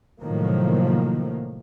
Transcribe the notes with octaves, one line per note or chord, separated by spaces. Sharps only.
A2 C3 D#3 F3 F#3 A#3